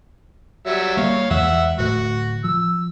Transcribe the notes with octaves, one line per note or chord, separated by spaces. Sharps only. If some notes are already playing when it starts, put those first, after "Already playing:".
F#3 G3 E5
G3 A#3 C#5 F5
E2 E3 G#3 E5 F#5
D1 A2 F#4
F3 E6